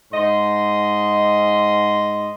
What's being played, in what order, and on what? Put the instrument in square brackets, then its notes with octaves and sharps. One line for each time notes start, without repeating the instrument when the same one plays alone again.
[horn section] G#2 D#5 C6